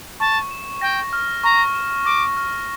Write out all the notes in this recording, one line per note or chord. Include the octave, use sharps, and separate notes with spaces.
A5 C#6
E7
G5 A#6
F6
A#5 C#6
E7
D6 A#6
F6